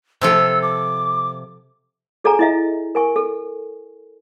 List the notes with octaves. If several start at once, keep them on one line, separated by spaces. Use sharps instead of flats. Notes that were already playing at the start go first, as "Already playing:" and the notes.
C3 F3 A4 E6
D6
G#4 A4 D5 G#5 A#5
E4 D#5 E5
A#4 G#5 C#6
A4